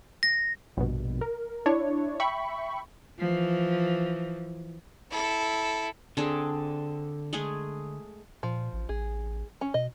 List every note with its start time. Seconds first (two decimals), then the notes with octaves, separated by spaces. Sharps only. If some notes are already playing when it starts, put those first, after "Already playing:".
0.23 A#6
0.77 A#1 G2 B2
1.21 A#4
1.66 D4 E4 C#5
2.20 E5 G5 B5 C#6
3.19 E3 F3
5.10 E4 A4
6.17 D3 C4 D4 G#4 A4
7.33 G#3 A3 G#4
8.43 A#2 F3
8.73 A1
8.89 A1 G#4
9.61 C#4
9.74 B2 D#5